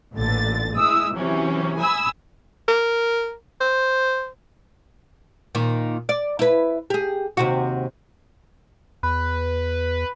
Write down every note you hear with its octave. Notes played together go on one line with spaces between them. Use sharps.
A1 A#2 D3 A6
G#3 E4 D#6 E6
C3 E3 F#3 C#4
G#5 B5 D#6 E6
A#4
C5
A#2 D#3
D5
E4 B4
G4 G#4
D#2 C3 F#4
E2 B4